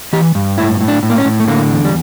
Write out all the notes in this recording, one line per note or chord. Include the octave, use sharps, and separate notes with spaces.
E3 G4
G2
A2 E4
A2
D4
A2
A#3
C#4
A2
A3
D3 A#3
E2
G3